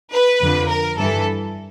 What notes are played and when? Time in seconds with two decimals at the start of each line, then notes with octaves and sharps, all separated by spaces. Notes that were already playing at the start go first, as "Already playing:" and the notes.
0.13 B4
0.42 F2 D3 F3
0.70 A#4
0.98 G2 E3 A4